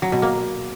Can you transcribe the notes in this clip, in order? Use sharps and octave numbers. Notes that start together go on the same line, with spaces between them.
F#3
B2
A#3